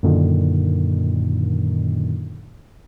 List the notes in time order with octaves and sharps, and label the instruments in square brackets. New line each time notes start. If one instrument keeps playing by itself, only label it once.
[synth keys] F#2 A#2 D3 D#3